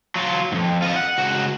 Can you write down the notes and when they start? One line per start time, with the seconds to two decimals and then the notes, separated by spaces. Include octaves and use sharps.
0.16 F#3 F4
0.52 F2 G#2
0.82 F4 D#5
0.96 F#5
1.18 C#2 F#4